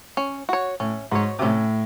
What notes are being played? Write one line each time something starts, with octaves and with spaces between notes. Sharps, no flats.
C#4
F#4 C#5
A2 C#4
G#2 F#4 C#5
C3
A2 C#4